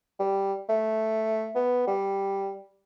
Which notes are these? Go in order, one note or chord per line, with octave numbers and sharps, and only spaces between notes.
G3
A3
B3
G3